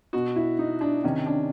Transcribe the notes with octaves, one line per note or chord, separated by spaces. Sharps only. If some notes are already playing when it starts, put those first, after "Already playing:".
B2 F#4
E4
D#4
D4
C3 D#3 C#4
D4